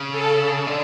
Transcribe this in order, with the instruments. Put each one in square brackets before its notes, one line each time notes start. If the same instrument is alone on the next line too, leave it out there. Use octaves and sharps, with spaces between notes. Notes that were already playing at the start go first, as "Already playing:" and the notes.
Already playing: [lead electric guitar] C#3
[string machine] A4
[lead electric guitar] D3